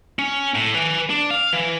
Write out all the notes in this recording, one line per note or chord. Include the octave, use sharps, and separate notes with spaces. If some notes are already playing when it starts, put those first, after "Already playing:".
C#4
A2
B4 G#5
D4
F5
E3